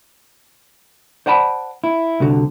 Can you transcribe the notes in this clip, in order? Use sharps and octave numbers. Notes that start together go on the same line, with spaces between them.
C5 D5 F#5 A5 B5
E4
C2 D3 F#4